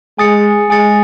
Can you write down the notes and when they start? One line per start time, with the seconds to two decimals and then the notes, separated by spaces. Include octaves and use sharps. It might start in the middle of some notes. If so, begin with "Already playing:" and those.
0.19 G#3 G#5 D#6 A6 C#7
0.70 G#3 G#5 D#6 A6 C#7